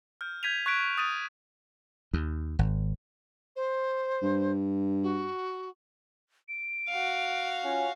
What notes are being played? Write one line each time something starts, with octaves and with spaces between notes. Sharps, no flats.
F6 G6
G6 G#6 B6 D#7 F7
C#6 F#6 G#6 B6 D7
D#6 A6 D#7 F7
D#2
G#1
C5
G2
F#4
D7
F#4 F5
C#4 F4 G#5